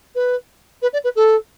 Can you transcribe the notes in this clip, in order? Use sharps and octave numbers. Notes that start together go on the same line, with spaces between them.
B4
B4
D5
B4
A4